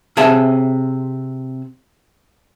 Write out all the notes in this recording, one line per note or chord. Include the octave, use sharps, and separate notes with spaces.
C3 G#4 E5 A5